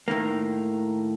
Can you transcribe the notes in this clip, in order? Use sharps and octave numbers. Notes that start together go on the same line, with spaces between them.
A2 D#3 A#3